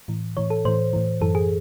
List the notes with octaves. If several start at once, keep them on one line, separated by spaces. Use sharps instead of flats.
A2 E3
A2 E3 C#5
A4
A2 E3 C5
A2 E3
F#2 E3 A4
G#4